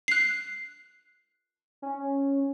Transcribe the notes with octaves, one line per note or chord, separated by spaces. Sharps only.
F#6 C7
C#4